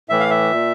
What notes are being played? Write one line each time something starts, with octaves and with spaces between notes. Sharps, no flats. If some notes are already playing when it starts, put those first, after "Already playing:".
A2 E3 E5
F5
E5
A#2